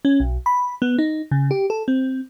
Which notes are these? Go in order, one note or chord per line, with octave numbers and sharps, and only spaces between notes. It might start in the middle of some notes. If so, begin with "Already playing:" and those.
C#4
B1
B5
B3
D#4
C#3
G4
A4
C4